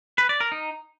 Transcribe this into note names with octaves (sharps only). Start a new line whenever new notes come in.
B4
D5
A#4
D#4